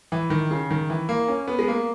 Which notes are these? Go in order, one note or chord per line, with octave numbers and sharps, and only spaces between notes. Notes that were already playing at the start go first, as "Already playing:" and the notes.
E3
D#3
C#3
D#3
E3
A#3
C#4
B3
G#3
A#3